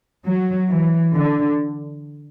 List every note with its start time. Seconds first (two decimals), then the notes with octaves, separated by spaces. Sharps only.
0.26 F#3
0.70 E3
1.15 D3